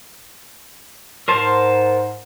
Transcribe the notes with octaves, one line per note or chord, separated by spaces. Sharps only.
G#2 A#4 C5 A5